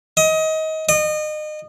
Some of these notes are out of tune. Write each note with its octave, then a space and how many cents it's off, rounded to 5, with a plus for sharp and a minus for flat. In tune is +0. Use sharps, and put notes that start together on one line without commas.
D#5 +25
D#5 -30